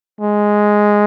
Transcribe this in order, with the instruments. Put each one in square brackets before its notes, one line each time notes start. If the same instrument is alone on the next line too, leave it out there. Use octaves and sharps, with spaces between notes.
[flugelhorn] G#3